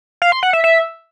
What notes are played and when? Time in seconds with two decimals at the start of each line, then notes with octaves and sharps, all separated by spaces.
0.22 F5
0.32 C6
0.43 F#5
0.53 E5
0.64 E5